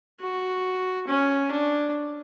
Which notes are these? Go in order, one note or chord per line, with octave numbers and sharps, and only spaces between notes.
F#4
C#4
D4